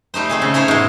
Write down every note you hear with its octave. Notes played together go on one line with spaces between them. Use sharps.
G3 A3 D#4 C5
A3 C4 G#4
C#3
C#4 D#4 E4 C5 C#5
G#2 B2